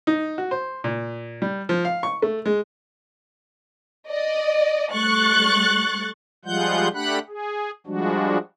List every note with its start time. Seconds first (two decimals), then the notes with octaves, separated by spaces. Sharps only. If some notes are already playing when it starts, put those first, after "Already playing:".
0.07 D#4
0.38 F#4
0.51 C5
0.84 A#2
1.42 G3
1.69 F3
1.85 F5
2.03 C#6
2.22 A3
2.46 G#3
4.10 D5 D#5
4.92 G3 A3 C#6 F#6 A6
6.45 F3 G3 G#3 F4 F#5 G6
6.94 A3 D4 G4 F#5 B5 F#6
7.28 G#4
7.87 F3 G3 G#3 D4 F#4